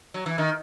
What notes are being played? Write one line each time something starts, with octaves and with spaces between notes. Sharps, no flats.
F#3
E3
D#3